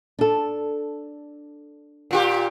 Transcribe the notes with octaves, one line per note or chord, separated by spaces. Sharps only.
D4 A4
A#2 F4 G4